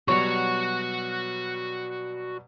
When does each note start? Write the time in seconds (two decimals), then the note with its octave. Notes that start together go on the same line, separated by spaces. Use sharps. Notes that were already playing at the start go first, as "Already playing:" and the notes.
0.08 B2 F#3 G3 F#4 C#5 F#5